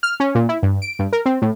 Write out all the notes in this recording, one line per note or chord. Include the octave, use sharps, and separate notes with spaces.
F6
C#4
A#2
E4
G2
D7
G2
A#4
C4
A2